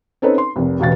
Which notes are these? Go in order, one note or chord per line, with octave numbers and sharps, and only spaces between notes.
C4 C#4 D#4 A4 B4 C#5
C6
F1 C2
E1 A1 B2 F5 A6